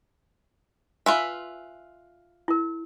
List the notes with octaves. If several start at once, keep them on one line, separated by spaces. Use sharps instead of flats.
F4 B4 E5 G#5
E4 A#4